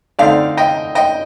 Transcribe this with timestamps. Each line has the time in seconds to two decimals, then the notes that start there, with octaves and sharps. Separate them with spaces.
0.19 D3 A3 C4 D#4 D5 F5
0.57 D#5 G5
0.95 D#5 G5